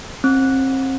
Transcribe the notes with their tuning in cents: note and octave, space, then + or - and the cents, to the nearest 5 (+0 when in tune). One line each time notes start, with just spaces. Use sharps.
C4 +30